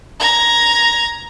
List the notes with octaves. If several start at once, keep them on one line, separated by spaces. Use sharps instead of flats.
A#5 G#6